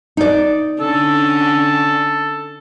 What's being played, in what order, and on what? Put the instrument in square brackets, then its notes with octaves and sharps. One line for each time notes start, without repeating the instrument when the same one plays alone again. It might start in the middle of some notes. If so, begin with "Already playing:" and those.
[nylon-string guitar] D#4 D5
[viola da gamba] D3 C#4 [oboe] A4